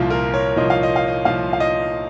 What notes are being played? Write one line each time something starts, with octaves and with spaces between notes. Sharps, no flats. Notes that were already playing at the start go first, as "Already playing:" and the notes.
Already playing: C2 A#2 F3 F4
A#4
C#5
C2 A#2 F3 D#5
F5
D#5
F5
D#5
C2 A#2 F3 F5
F5
D#5